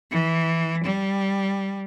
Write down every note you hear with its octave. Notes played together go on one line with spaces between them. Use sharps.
E3
G3